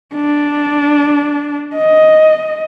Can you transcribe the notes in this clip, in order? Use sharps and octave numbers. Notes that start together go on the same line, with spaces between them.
D4
D#5